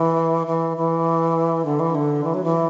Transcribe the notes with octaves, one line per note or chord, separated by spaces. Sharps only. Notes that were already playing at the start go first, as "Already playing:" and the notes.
Already playing: E3
E3
E3
D3
E3
D3
E3
F#3
E3